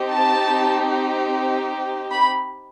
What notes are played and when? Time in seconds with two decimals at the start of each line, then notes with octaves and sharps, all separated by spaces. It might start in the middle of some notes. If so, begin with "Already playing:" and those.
Already playing: C4 D#4 G4
0.11 A5
2.11 B5